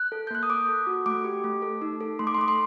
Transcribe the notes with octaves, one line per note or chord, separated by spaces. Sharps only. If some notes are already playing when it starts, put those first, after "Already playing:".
Already playing: F#6
A4
G6
A#3 F#6
D#6
A4 D6
A4
F#4
A3 D6
G4
A3
A4
D#4
A4
A3 C6
D6
C6
A3 D6
C6